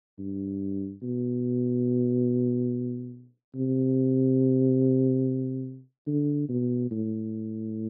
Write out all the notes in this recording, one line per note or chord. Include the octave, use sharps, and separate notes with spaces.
G2
B2
C3
D3
B2
A2